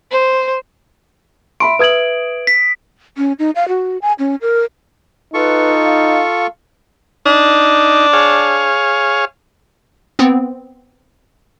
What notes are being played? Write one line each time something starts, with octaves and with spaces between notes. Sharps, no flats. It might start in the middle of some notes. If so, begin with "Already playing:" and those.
C5
E5 B5 C6 D7
B4 E5 D#6 G#6 F#7
B6
C#4
D#4
F5
F#4
G#5
C#4
A#4
D#4 F4 A4 B4 C#6
F5
D4 D#4
G#4 C#5 F5
B3 C4